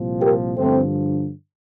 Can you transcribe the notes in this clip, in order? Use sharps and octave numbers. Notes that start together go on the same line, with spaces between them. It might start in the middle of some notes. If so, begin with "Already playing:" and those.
Already playing: C2 A#2 F3
G4 A#4
G2 D3 F3 A3 C4